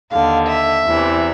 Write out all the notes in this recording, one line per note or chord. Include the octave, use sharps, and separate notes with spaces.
D#2 D3 F5
E5
E2 C3 E3